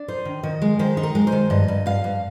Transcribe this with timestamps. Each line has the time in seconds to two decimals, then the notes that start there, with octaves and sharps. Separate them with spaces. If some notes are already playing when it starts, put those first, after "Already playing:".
Already playing: D4
0.08 D#4 C5
0.25 D#3
0.43 D#3 D#5
0.62 G#3
0.79 D#3 C5
0.97 D#4
1.03 A#4
1.15 G#3
1.27 C5
1.32 D#3
1.50 G2 D#5
1.68 G2
1.86 G2 F5
2.04 G2